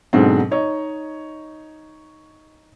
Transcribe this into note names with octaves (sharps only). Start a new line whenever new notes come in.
G#2 B2 D3 F#3 C4
D#4 C#5 D#5